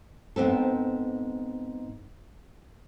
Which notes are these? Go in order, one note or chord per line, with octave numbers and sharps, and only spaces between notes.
G#2 B3 C4 A4